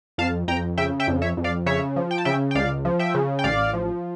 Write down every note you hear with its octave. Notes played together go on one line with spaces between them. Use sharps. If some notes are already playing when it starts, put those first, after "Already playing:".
F2 F5 A5
F2 G5 A#5
C#3 E5 G5
E5 G5
F2
C#5 E5
F2
D5 F5
C#3 C#5 E5
F3
G5
A5
C#3 E5 G5
G5
C#2 D5 F5
F3
E5 G5
C#3
G5
A1 D5 F5
F3